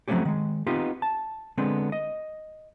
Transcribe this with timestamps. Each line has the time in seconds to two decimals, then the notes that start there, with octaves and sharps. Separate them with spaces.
0.08 F3 F#3 A3 C4 C#4 G4
0.25 D#3 G#3
0.67 B3 C4 D#4 F4 G4
1.02 A5
1.58 D3 G#3 B3 C4
1.92 D#5